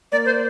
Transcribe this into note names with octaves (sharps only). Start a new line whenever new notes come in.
A#3 D5
C5